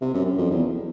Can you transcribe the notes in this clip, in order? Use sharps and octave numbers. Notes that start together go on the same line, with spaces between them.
C3
F#2
F#2
F2
E2